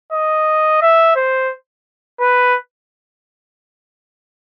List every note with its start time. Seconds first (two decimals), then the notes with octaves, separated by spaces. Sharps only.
0.13 D#5
0.82 E5
1.16 C5
2.20 B4